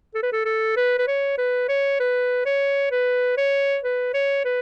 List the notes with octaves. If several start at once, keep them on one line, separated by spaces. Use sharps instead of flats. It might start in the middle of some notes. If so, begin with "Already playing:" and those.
A4
B4
A4
A4
B4
B4
C#5
B4
C#5
B4
C#5
B4
C#5
B4
C#5
B4